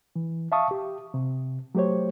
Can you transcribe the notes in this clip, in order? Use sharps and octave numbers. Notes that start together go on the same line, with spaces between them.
E3
E5 F5 A5 C#6 D#6
G4
C3
F#3 A3 G4 C5 C#5